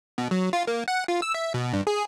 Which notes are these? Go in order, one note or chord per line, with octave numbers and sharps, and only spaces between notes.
B2
F#3
F4
A#3
F#5
F4
E6
E5
B2
G2
G#4